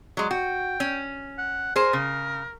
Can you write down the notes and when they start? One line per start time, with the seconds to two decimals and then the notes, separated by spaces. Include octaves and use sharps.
0.17 F#3 G#3
0.31 F#4 G5
0.80 C#4
1.38 F#5
1.76 G#4 A#4 C5
1.93 C#3